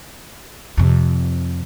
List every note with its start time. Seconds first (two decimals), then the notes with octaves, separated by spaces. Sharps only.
0.77 F2 C3